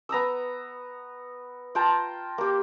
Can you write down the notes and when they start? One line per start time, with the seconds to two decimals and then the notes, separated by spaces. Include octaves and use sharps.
0.09 B3 A#5 D#6 E6
1.75 F4 G5 A5 A#5
2.38 A#3 G4